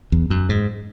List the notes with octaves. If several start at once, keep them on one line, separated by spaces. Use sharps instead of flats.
E2
F#2
G#2